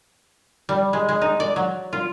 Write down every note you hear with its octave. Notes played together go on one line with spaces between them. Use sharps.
G3
G#3
G#3
D#4
D5
F#3
F4